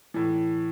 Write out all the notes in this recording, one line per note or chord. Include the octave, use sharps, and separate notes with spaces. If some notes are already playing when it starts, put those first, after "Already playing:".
A2 E3